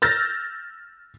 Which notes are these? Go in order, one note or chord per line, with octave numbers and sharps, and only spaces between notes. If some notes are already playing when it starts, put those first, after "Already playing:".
E6 F6 G6 A6 A#6